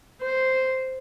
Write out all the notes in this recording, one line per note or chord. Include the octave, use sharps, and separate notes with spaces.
C5